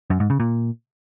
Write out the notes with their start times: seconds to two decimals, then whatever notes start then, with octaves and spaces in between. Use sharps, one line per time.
0.10 F#2
0.20 G#2
0.30 C#3
0.40 A#2